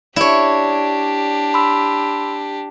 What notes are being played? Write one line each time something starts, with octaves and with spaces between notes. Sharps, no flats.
D4 E4 G4 C#5 D5
B5 C6 E6